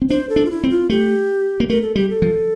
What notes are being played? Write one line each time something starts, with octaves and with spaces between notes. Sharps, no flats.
C4
D4 C5
A4
D4
F4
E4
C4
F4
A3 G4
A#3
A3 A#4
A4
G3 G4
A4
F3